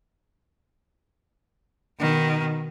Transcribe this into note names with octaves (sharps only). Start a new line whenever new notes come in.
B2 D#3